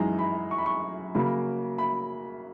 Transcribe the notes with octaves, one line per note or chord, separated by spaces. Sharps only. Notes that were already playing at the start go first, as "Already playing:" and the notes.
Already playing: F#2 E3 G#3 D#4 A#5
B5
C#6
B5
C#6
C#3 F#3 A#3 B5
B5